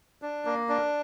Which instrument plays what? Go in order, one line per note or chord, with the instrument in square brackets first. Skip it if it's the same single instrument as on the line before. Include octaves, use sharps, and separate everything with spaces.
[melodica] D4
A#3
D4